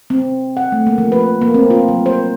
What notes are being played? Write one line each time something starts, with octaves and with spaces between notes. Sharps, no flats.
C4
F#5
A3
A#3
F3
B4
A#3
C4
F4
F#3
C5